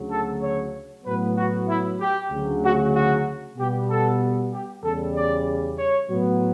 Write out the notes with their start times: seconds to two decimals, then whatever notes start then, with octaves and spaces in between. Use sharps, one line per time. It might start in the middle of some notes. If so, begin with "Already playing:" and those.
Already playing: D2 C#3 F#3
0.10 A4
0.42 C#5
1.05 A2 F#3 B3 B4
1.37 F#4
1.68 E4
2.00 G4
2.31 D2 C#3 F#3
2.63 F#4
2.94 F#4
3.57 B2 G3 B3 G4
3.88 A4
4.52 G4
4.83 E2 C#3 G3 A4
5.14 D5
5.78 C#5
6.10 A2 F#3 B3